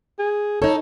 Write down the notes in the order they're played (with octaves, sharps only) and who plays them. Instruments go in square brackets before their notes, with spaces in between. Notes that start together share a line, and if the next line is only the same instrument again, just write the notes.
[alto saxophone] G#4
[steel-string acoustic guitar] D#4 A4 [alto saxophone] C#5